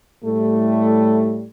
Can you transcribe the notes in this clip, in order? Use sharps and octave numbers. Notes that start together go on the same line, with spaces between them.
A2 G3 A3